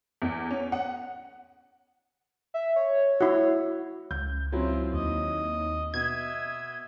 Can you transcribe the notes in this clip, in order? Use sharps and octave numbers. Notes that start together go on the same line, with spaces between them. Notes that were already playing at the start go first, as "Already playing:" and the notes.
E2
C#4
F#5
E5
C#5
E4 F#4
C#2 G6
F#3 C4 C#4 E4 F4
D#2 D#5
B2 D#5 E5 G#6